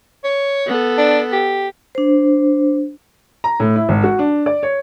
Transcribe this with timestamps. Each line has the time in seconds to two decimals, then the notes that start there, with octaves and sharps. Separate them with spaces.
0.24 C#5
0.67 B3 A4
0.98 D4
1.32 G4
1.95 D4 C5
3.44 A#5
3.60 A2
3.76 E4
3.89 G#1
4.04 F#4
4.19 D4
4.46 D5
4.63 C#5